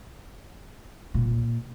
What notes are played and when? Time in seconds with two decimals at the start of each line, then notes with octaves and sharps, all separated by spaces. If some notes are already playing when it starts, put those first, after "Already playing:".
1.14 A#2